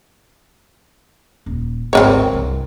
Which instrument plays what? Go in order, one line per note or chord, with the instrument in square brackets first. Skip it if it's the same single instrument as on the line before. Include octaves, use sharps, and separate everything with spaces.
[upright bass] D#1
[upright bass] G#1 D2 [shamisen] C4 A#4 C#5
[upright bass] C2 G2